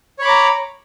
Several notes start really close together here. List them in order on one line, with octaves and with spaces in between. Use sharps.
C#5 B5 D6 A#5